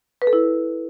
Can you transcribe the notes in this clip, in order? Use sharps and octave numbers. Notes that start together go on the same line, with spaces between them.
B4
A4
E4